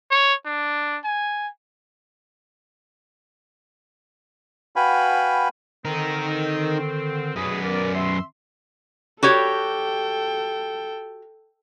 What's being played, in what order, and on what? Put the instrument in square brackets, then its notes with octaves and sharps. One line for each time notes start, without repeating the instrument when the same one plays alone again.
[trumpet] C#5
D4
G#5
[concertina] F#4 B4 F5 G5 G#5 B5
[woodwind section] D3 D#3 C4 [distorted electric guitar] D#4 A#4
[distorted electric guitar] F#2 B3 [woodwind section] G#4
[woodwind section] A#4 D5
E5 C6
[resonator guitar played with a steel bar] F#4 G4 C#5 [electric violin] A4 G5